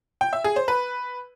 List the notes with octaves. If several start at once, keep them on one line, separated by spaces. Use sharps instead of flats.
G5
E5
G#4
C5
B4